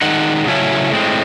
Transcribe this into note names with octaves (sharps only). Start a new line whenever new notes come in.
D#3 G#3 D#4 F#5
C#3 F#3 A3 C#4 E4
A2 G#3 C4